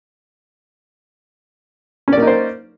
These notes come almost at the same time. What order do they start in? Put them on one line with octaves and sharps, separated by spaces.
C#4 D5 A#3 D#4 C5